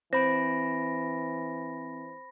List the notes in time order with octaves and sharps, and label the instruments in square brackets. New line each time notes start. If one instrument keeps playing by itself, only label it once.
[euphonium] E3 [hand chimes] C4 D7 [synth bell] C5 [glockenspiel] B5 A#6